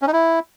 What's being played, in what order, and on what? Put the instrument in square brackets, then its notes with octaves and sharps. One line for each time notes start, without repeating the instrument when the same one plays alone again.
[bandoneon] C#4
D#4
E4